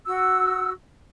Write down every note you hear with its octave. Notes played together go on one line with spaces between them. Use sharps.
F#4 E6